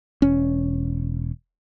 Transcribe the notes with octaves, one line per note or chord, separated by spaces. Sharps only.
E1 C#4